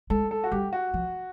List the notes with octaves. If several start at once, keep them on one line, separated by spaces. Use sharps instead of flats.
G#3 A4
A4
F#4
G3 G4
F#4
F3